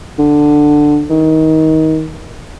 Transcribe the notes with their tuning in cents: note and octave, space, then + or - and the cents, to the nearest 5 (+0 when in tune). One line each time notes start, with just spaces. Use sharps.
D3 +10
D#3 +25